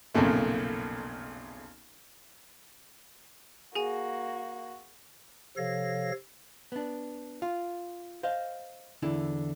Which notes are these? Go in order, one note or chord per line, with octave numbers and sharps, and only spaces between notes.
B1 F2 A#2 C#3 A3
A#3 F#4 G#4 G#5
C3 F3 A4 C#5 F5 A#6
B3 D4
F4
C5 D#5 F5
E2 D3 E4